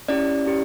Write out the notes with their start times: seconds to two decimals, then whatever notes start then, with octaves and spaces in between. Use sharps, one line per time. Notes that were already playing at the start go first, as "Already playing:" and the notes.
0.08 C#4 E4 G4 D5
0.46 C#4 E4 G4